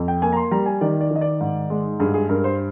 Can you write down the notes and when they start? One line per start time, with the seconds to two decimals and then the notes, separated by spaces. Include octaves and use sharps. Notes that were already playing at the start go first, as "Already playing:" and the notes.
Already playing: F2
0.08 G5
0.22 A#3 G#5
0.32 A#5
0.37 C6
0.51 G3 A#5
0.66 G#5
0.81 D#3 D5
1.01 D5
1.11 D#3 D#5
1.21 D5
1.41 G#2
1.70 G#3
2.00 G2 G#4
2.14 G#4
2.29 G2 A#4
2.44 C5